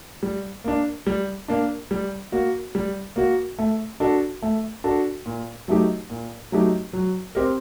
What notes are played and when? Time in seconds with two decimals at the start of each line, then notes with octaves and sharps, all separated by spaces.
0.23 G3
0.64 A#3 D4
1.07 G3
1.48 A#3 D4
1.91 G3
2.32 A#3 F#4
2.75 G3
3.16 A#3 F#4
3.58 A3
4.00 D4 F#4 A4
4.42 A3
4.84 D4 F#4 A4
5.26 A#2
5.68 F#3 A3 D#4 G4
6.10 A#2
6.52 F#3 A3 D#4 G4
6.93 F#3
7.35 C4 G4 A#4